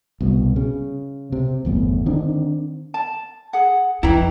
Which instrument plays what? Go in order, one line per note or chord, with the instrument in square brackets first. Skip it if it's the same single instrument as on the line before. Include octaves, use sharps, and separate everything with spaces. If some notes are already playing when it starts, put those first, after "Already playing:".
[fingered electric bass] C2 B2
C#3
C3
G1 E2 A2
D3 D#3 C4 D4
[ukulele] A5
G#4 F#5
[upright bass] F2 [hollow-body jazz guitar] E3 E4 [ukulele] D#4 G5 A#5